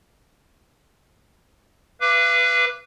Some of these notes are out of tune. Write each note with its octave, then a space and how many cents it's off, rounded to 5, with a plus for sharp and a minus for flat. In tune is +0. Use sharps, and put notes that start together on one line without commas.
B4 +0 F5 -40 D6 +0